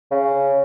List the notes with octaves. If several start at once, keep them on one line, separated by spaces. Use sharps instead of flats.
C#3